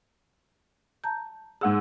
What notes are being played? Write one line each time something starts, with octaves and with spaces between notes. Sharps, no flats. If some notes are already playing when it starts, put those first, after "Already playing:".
A5 A#5 G6
G#2 G#4 F#5 E6